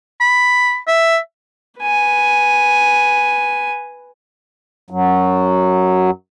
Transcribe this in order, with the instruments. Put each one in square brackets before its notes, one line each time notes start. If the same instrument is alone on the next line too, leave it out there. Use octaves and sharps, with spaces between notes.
[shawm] B5
E5
[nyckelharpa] B4 G#5
[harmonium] F#2 F#3